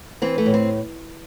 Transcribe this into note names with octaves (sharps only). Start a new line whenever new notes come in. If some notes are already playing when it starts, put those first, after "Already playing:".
E3 C4
A3
A2
C4